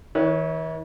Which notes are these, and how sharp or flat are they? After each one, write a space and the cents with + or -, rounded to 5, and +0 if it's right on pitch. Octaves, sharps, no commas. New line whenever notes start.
E3 -45 C#5 +0